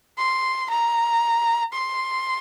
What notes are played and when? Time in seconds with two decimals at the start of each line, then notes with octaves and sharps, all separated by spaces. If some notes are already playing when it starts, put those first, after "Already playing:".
0.18 C6
0.71 A#5
1.73 C6